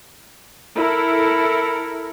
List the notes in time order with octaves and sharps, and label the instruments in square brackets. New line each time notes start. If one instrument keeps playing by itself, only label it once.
[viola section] E4 A4 A#4